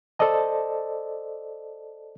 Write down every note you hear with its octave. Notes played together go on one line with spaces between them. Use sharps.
A4 C5 D5 D#5 A5